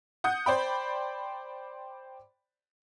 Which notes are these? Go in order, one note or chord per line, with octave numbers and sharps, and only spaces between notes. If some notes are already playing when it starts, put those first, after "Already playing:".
F#5 D#6 G6
C5 D5 G5 B5